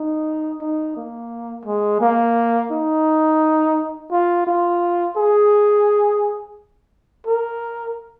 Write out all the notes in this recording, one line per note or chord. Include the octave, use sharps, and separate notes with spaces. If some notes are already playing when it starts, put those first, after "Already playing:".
Already playing: D#4
D#4
A#3
G#3
A#3
D#4
F4
F4
G#4
A#4